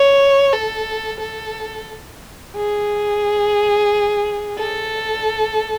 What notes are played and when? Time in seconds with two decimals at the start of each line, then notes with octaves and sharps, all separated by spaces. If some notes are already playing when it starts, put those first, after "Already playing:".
Already playing: C#5
0.52 A4
1.20 A4
2.55 G#4
4.58 A4